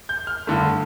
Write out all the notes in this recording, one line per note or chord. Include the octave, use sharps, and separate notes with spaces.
G6
F6
G2 D3 A3